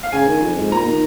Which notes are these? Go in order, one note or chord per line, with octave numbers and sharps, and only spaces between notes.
F5
C#3 G#5
D#3
F2
G#2
A#2 A#5
D#3